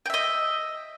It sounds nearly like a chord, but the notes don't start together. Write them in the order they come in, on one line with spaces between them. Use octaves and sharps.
G5 E5 D#5